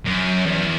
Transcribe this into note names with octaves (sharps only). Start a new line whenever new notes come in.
F#2
E2